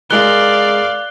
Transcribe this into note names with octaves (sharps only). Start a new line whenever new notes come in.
G#3 A#4 D5 F5 F#6 G7